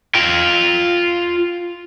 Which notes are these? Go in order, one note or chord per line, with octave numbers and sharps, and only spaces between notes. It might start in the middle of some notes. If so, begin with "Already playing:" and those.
F4 G5